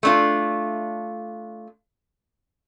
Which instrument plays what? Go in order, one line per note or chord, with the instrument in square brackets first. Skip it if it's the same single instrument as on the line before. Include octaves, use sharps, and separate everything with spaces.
[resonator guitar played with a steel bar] A3 D4 F4